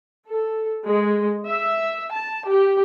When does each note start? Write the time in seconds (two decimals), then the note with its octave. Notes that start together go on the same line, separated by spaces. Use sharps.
0.26 A4
0.85 G#3
1.46 E5
2.11 A5
2.47 G4